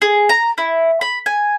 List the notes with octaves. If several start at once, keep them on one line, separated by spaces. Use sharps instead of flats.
G#4
A#5
E4
B5
G#5